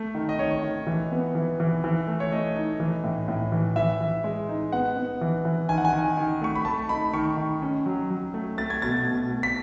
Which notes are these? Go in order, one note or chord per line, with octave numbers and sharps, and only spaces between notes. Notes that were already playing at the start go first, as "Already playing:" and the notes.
Already playing: A3
D#3
D#5
D#3 C#5
D#3
E3
B3
E3
E3
E3
A3
C#5
A3 D#5
D#4
E3
A2
A2
E3
E3 E5
E3
G#3
D#4
B3 F#5
B3
E3
E3
D#3 G#5
F#5
G#5
D#3
D#3
A3 C#6
B5
A3 A5
D#4 B5
D#3 C#6
D#3
C#4
F#3
F#3
A3
A3 A6
G#6
B2 A6
B2
A3
B6